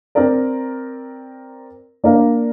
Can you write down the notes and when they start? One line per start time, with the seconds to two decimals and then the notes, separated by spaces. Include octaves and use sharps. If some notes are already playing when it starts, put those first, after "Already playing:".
0.15 C4 A#4 D5
2.04 A#3 D4 A#4 F5